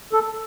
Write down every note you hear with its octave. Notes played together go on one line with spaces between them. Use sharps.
A4